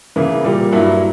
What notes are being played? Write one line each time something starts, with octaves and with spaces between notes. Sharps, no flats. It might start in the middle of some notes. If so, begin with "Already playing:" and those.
C#3 E3 A#3 E4
A#2 G3 A#3
G2 F#3 A#3 E4